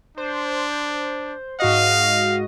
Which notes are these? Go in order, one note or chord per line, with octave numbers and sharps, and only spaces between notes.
D4 C5
G#2 F#4 D#5 F5